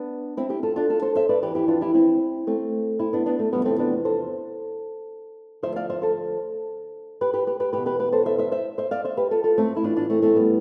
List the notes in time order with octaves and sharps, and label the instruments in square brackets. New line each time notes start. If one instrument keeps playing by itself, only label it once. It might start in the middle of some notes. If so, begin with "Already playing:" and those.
Already playing: [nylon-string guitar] B3 D4
C4 E4
E4 G4
F4 A4
D4 F4
F4 A4
A4 C5
C5 E5
B4 D5
E3 G4 B4
F2
E4 G4
D4 F4
E4 G4
C4 E4
A3 C4
C4 E4
B3 D4
B3 D4
A3
E2 C3 F3 G3 B3
A3 C4
B3 D4
A4 C5
D2 C3 F3 C5 E5
D5 F5
C5 E5
A4 C5
G4 B4
G4 B4
G4 B4
G4 B4
E2 B2 G4 B4
G4 B4
G4 B4
A4 C5
C5 E5
C5 E5
C5 E5
C5 E5
D5 F5
C5 E5
G4 B4
F4 A4
F4 A4
A3 C4
E4
A2 E3 D4 F4
D4 F4
A3 C4
A3 C4
G3 B3